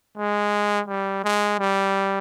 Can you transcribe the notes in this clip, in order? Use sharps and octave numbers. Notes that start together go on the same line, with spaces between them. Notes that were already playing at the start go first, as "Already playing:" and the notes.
G#3
G3
G#3
G3